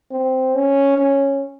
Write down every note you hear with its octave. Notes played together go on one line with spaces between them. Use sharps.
C4
C#4
C#4